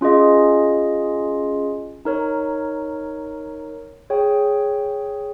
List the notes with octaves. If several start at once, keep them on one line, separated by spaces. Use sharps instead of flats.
C#4 F4 G#4 D#5
D#4 A#4 C#5
G#4 C#5 G5